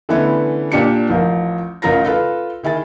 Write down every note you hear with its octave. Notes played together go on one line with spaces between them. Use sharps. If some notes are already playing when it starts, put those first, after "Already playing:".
D3 E3 A3 B3 C#4 E4
A#2 A#3 D4 G4 A5 C#7
A1 F3 A#4
A1 C#3 F4 A#4 A#5 A#6
F4 A4 B4
D#3 E4 G#4 A6